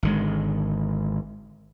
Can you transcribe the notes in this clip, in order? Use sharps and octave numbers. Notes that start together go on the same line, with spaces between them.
G#1 D3 G#3